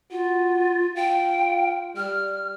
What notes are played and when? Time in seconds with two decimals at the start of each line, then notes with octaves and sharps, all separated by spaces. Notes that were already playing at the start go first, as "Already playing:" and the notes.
0.11 F4 F#4
0.96 F4 G5
1.97 G3 F6